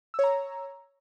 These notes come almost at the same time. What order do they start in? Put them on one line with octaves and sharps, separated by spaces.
E6 C#5 A#5